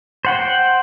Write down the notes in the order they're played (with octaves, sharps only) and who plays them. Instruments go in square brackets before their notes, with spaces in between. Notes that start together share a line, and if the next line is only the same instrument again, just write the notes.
[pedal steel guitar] C5 F#5 G5